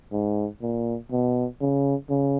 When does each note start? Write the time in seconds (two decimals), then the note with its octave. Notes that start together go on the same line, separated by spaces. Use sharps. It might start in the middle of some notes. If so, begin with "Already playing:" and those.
0.12 G#2
0.62 A#2
1.11 B2
1.61 C#3
2.09 C#3